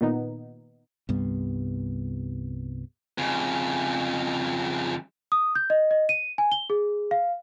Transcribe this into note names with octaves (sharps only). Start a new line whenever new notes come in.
A#2 D#3 B3 D#4
C2 G2 G3 B3
F2 C#3
D#6
G6
D#5
D#5
D#7
G#5
G7
G#4
F5